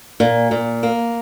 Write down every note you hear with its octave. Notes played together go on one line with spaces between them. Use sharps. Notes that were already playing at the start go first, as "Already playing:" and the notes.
A#2
A#2
A#3